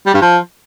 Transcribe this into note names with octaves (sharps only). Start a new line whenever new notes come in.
G3
G2
F3